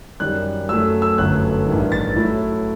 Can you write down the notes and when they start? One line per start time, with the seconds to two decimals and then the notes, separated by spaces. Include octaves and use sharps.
0.20 F#2 D#3 G3 F#6
0.69 F#2 F#3 A3 E6
1.02 E6
1.18 G1 F#2 F#3 A3 F#6
1.67 A1 G2 D#3
1.92 A6
2.16 A2 F#3 A3 E4